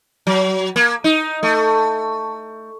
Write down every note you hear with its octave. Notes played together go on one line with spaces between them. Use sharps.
F#3
A#3
D#4
A3